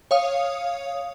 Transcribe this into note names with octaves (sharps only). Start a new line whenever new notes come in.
C#5 F5 D#6